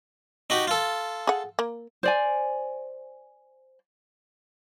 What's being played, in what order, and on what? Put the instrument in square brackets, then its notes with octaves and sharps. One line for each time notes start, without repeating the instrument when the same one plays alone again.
[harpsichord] D#4 F#4 G4
F4 A4
[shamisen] G#4 F#5
A#3
[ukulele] C5 D5 G#5